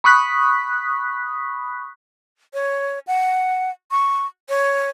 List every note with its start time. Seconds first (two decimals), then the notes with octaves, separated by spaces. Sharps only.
0.04 B5 C#6 D#6 F#6 B6
2.54 C#5
3.07 F#5
3.91 C#6
4.49 C#5